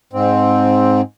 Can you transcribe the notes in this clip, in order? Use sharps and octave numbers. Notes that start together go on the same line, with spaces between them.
G#2 C4